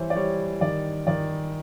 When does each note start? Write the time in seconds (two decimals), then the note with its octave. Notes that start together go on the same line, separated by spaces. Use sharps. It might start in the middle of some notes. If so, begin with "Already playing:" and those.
Already playing: E3 G3 C5 C#5
0.10 D5
0.16 G3 C#5
0.61 D#3 D5
1.07 D#3 D5